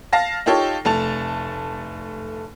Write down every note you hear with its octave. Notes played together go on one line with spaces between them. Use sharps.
F5 A5 A#6
D#4 F4 G4 A4 C#5
F1 A3 A5 F7